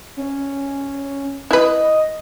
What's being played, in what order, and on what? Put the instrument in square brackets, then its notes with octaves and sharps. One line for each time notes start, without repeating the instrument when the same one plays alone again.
[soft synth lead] C#4
[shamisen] E4 B4 [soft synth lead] D#5